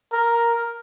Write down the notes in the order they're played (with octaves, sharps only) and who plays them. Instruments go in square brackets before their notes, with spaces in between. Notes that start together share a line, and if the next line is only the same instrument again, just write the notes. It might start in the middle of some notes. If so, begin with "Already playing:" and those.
[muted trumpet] A#4